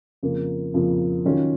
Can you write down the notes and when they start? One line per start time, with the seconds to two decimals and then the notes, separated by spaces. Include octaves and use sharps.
0.23 F2 C#3 F3 A#3
0.74 F2 C#3 F3 A#3
1.25 D#3 F#3 C#4 F4